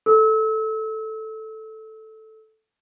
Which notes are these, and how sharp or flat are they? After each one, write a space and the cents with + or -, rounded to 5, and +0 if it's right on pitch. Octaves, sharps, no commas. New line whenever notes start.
A4 +0 E6 -35